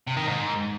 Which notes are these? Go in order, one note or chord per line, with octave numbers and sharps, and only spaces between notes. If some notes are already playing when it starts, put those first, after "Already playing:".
C3
D#3
G#2